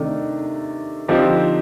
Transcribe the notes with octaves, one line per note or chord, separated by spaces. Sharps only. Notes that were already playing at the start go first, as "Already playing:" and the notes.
Already playing: C3 D#3 A3 D4
D3 F3 C4 D#4 G4